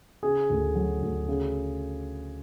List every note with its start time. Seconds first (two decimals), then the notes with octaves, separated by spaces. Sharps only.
0.23 C#3 G#4
0.50 D2
0.75 F#3
1.02 D2
1.28 C#3